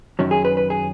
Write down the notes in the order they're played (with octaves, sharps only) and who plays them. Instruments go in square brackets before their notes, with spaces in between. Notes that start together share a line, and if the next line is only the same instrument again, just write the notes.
[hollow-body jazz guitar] F#2 D#3 F#3 C#4
G#4
B4
B4
G#4